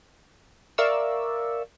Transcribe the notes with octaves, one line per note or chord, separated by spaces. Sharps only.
A#4 D5 E5 F5 C#6 E6